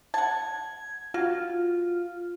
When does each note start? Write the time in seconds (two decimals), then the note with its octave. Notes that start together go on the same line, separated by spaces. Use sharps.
0.14 F#5 A5 G#6
1.14 F4 F#4